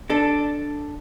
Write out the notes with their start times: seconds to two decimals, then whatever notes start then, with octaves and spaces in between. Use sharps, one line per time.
0.10 D4 A4